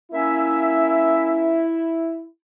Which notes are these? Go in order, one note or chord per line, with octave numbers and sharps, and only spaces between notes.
A#3 C#4 E4 E5